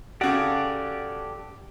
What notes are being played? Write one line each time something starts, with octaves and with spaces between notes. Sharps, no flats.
C#3 F#4 G4 A4 D5